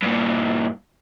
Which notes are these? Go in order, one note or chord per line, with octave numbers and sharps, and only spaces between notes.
G2 A#2